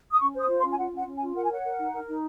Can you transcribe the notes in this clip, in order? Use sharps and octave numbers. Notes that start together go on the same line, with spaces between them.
D#6
C#4 C#6
C5 D#6
F4
C6
C#4
G#5
F4 F#5
C#4 F#5
C#4
G#5
F4
A#4 F#5
G#5
C#5 F#5
A#4
D#4
A#4
D#4